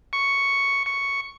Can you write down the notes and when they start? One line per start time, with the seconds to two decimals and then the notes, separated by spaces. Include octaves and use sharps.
0.13 C#6
0.86 C#6